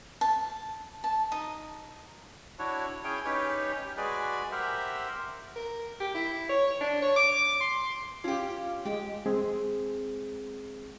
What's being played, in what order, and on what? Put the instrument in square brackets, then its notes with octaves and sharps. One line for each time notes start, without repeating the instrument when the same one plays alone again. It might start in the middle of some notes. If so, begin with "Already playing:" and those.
[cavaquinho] A5
A5
D#4
[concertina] D4 E4 F#4 C#5
C#4 E4 G#4 C#5 G5
C#4 D#4 G4 B4 C#5
G4
G#3 F#4 G#4 B4 D5
G4 A#4 C5 E5 F#5
[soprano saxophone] A#4
G4
E4
C#5
D4
C#5
D6
C6
[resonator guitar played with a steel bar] C#4 G4 [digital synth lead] F4
[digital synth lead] G#3 [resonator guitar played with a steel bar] G4
[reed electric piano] G#3 C4 G#4